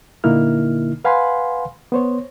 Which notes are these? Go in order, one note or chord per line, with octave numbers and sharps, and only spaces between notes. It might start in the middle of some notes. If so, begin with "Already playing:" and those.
A#2 D3 A#3 D#4 E4 F6
B4 F5 F#5 G#5 B5 C6
B3 C5 C#5